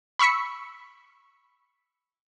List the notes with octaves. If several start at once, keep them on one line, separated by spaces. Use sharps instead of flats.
B5 C#6 E6 B6 C#7